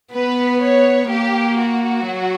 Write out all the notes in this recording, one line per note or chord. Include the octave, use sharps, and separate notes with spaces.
B3 B4
C#5
A#3 G4
F#4
F#3